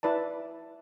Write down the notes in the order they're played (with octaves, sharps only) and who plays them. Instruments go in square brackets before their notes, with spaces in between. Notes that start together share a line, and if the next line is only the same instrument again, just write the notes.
[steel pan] E4 B4 D5 A5